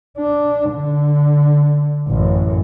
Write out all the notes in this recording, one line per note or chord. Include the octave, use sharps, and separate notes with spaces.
D4
D3
A1 F#2